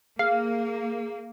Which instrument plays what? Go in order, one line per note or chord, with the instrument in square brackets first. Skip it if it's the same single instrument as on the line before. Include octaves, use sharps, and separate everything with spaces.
[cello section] A#3 [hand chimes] G#4 [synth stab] F5